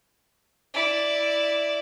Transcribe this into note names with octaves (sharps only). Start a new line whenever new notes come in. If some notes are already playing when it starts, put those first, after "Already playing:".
E4 D5